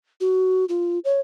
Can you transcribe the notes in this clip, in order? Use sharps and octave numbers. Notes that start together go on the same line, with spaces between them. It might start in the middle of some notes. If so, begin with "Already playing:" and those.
F#4
F4
C#5